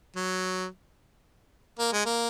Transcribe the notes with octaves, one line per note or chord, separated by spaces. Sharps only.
F#3
A#3
G#3
A#3